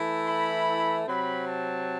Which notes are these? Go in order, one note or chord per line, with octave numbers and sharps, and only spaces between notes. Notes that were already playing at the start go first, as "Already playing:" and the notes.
Already playing: E3 A3 E4
B5
C3 F#3 C4 B5
A5